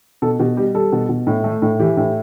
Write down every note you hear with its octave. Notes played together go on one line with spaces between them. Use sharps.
B2 A4
B2 G4
G3 G4
G3 A4
B2
B2
A2
A3
A2
E3 G4
A2